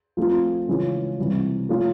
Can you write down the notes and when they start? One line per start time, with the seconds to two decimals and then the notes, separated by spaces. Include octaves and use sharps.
0.17 F3 A3 C4 F4
0.68 C#3 E3 G#3 C#4 F4
1.19 C3 E3 G3
1.69 F3 A3 C#4 F4